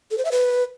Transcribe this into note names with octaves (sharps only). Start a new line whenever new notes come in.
A4
C5
E5
B4